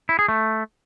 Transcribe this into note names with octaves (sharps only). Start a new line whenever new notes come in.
E4
G#4
A3